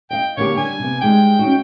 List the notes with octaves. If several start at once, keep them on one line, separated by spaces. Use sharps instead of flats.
D#5 F5 G5
D3 A#3 G4 C#5
G3 D4 G#5
C3 B3
G3 G#3 D#4 G5
C#4 D#4 F#4